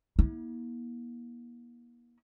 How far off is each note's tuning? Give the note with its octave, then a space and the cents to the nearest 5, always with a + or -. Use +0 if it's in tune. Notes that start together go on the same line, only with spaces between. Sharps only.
A#3 +40 E4 -40